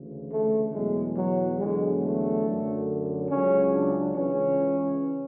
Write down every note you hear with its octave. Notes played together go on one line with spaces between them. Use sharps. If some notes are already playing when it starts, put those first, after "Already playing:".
Already playing: D2 C#3 E3
A3
E2 B2 F#3 G#3
F#3
E2 D3 F#3 G#3
A3
F#2 D3 F#3
C#2 C#3 F#3 C#4
D4
C#2 C#3 E3 C#4